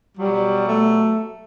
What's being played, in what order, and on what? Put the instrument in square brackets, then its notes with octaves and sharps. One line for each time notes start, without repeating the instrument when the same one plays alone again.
[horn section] B2 F#3 G3
A3